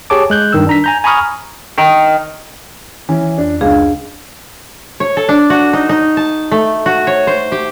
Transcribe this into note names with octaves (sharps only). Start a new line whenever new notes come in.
G4 G#4 C#5 A5 D6
G#3 F#6 G6
G2 D#3 E6
D4 A#5 B6
G#5 A#5 G6
G#5 A#5 B5 C#6 D#6 F6
D#3
E3 C#4
F2 D4
C#2 D4 G#4 F5
C#5
A4
D4
F#4
D#4
D#4
A5
A3
F#4
C#5
C5
G4